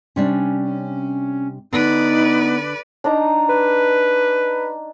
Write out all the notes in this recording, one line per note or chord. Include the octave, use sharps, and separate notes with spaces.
C3 G3 C#4 D4
D3 B3 D#4 B4 D5
D4 D#4 A#5
B4